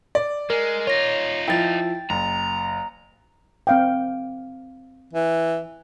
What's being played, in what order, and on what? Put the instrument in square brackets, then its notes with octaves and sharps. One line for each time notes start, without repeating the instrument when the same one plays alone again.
[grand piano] D5
[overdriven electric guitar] G#3 [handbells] A#4
[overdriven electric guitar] D#4 F4 [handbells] C#5 A#6
[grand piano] F3 E4 [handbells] G5 A6
[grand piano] F#1 [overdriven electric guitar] A#5
[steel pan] C4 F5 G5
[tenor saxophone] E3